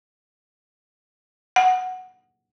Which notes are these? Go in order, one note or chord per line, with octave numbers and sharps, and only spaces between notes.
F#5